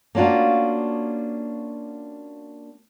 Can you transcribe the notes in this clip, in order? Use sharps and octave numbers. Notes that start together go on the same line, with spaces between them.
A#3 C#4 D4 F4 F#4